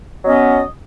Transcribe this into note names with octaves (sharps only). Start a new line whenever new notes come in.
F#3 B3 C#4 D#5